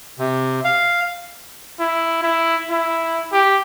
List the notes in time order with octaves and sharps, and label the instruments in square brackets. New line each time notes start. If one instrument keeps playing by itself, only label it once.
[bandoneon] C3
F5
[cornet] E4
E4
E4
G4